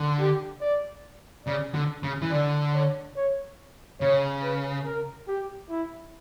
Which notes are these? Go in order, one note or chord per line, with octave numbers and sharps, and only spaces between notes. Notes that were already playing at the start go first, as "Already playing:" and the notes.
Already playing: D3
G4
D5
C#3 D5
D3
C#3
E3
D3 D5
C#5
C#5
C#3 C#5
B4
A#4
G4
E4